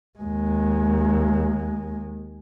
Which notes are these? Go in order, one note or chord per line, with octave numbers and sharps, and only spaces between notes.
D#2 G#3